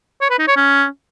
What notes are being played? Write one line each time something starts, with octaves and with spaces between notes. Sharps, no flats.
C#5
B4
D#4
C#5
C#4